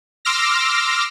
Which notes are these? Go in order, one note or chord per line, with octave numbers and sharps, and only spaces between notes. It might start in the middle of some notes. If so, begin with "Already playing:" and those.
C6 D6 E6 F6 A#6